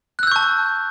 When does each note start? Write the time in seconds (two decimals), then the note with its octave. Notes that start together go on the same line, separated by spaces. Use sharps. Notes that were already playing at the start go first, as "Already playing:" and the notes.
0.19 F#6
0.23 E6
0.27 G6
0.32 C#6
0.36 A5